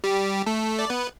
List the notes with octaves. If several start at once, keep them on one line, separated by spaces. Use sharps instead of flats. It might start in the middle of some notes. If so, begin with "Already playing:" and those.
G3 G4
A3 A4
D5
B3 B4